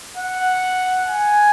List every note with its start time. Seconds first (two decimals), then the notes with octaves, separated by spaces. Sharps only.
0.17 F#5
1.06 G#5